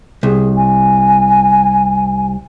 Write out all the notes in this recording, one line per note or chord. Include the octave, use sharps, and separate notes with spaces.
C2 G#4
G#5